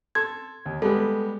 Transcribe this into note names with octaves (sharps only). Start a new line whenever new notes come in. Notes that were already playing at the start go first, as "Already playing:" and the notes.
A4 C6 G#6
D#2
G3 G#3 B3 A4